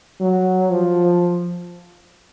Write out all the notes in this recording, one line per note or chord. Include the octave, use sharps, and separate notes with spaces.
F#3
F3